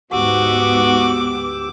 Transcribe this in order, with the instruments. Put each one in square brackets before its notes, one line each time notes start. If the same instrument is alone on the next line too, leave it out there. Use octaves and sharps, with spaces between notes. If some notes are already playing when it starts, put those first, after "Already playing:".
[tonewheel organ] D2 G4 E6 [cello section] G#2 B3 [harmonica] F#4 [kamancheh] D6